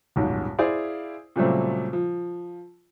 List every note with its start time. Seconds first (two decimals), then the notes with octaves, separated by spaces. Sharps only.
0.16 D#1 B1 G#2
0.58 E4 G#4 C5 D5 F5
1.36 A#2 C#3 F#3 G3 A3 C4
1.93 F3